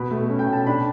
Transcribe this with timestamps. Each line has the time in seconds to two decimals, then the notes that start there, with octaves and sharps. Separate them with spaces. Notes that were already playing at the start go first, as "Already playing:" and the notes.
Already playing: B2 B5
0.11 A3
0.30 C#4
0.39 G5
0.48 B2 A5
0.67 D4 B5